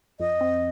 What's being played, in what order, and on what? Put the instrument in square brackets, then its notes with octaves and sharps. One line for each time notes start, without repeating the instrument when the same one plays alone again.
[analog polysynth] F2 [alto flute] D#5
[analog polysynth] C4